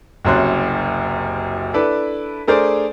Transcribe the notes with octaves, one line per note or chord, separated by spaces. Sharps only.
F#1 C2 F#2 C#5 C6 F#6
D4 E4 A4 B4 D5
A3 D4 G#4 A#4 C5 D5